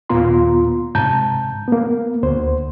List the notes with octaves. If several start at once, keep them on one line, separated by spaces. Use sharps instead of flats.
D#2 A#2 B3 F4 A#5 C6
G#2 C3 A5 A#5 G6
A#3 B3
D2 C5